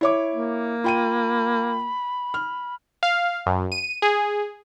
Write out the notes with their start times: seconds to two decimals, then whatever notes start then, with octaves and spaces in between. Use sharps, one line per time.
0.01 E4 C#5 D6
0.33 A#3
0.84 F4 G5 B5 D#7
2.34 F6
3.03 F5
3.46 F#2
3.72 D#7
4.02 G#4